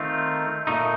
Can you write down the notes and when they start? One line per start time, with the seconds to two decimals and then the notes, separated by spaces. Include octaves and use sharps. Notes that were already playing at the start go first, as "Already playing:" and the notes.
Already playing: D#3 A3 C4 F4
0.67 A#2 A3 D#4